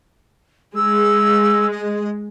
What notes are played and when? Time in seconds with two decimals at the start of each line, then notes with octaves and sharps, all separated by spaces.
0.76 G#3 E6
1.71 D#5